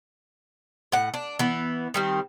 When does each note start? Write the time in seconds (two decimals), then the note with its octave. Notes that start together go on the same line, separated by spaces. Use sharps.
0.92 A2 F#5
1.14 D4
1.39 E3 B3
1.94 D#3 G3 C4